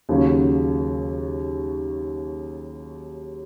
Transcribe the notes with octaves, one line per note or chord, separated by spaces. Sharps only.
D#2 C#3 F#3 C#4